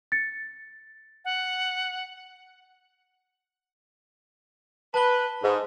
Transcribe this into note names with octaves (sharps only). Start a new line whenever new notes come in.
A6 C#7
F#5
B4 A5 G7
G#2